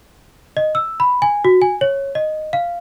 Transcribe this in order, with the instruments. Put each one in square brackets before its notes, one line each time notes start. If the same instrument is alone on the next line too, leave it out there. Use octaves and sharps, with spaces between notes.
[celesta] D#5
E6
B5
G#5
F#4
G#5
C#5
D#5
F5